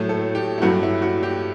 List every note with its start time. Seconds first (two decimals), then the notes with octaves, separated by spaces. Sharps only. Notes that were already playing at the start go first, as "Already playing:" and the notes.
Already playing: A2 F#3 A3
0.09 A4
0.35 G4
0.58 E4
0.62 G2 F#3 A3 F#4
0.83 E4
1.02 F#4
1.23 G4